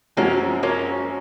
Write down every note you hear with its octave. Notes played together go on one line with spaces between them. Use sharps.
F#2 F3 G#3 A#3 C4 C#4 F#4
A#3 C#4